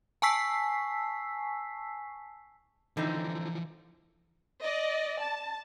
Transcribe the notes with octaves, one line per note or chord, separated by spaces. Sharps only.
G#5 A5 C#6 E6 B6 C7
D3 E3 F3 C4 D#4
D5 D#5
A5